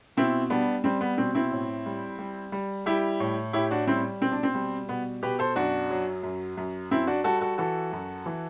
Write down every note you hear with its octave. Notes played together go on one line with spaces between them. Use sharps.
B2 C4 E4
G3 B3 D4
G3 C4
B3
B2 C4
C4 E4
A2
G3
G3
G3
G3 E4 G4
A2
A2 E4 G4
D4 F#4
G3 C4 E4
B2 C4
D4
C4
G3
B2 B3
B2 G4 B4
A4 C5
F#2 D4 F#4
F#3
F#2
F#2
F#2 C4 E4
D4 F#4
G3 F#4 A4
F#4 A4
E3 F#4 A4
F#2
E3